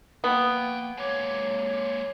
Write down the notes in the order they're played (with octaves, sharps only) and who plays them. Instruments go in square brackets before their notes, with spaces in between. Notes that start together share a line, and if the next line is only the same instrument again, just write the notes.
[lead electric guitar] F3 G5 [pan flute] A#3 [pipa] B3
[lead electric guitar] G#3 A#3 [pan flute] C#5